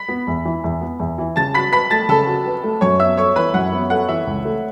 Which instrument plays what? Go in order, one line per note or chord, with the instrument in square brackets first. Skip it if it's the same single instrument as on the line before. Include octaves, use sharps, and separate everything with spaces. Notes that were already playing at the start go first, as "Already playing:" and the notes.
Already playing: [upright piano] B5 B6
[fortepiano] B3
E2
E3
E2
B3
E2
E3
[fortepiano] C#3 [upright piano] A5 A6
[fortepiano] F#4 [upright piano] B5 B6
[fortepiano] B4 [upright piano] B5 B6
[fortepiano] A3 [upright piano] A5 A6
[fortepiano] C#3 [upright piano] A4 A5
[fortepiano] F#4
B4
A3
[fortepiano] F#2 [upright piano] C#5 C#6
[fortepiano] B3 [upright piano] E5 E6
[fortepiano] A4 [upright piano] C#5 C#6
[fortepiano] E3 [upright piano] B4 B5
[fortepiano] F#2 [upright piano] F#5
[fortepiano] B3
[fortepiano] A4 [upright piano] F#5
[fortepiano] E3 [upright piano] E5
[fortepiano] C#2
A3